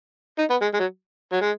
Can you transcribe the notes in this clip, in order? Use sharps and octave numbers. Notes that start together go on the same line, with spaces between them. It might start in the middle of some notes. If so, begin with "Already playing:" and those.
D#4
B3
G#3
G#3
F#3
F#3
G#3